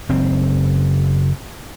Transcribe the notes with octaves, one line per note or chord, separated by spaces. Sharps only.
F#1 C4